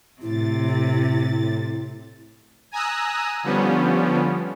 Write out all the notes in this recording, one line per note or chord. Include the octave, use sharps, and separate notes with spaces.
A2 C3 E4 A6
G#5 A#5 D#6 E6 F#6
D3 F3 G3 B3 C#4